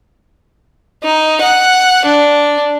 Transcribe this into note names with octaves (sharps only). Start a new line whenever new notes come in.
D#4
F#5
D4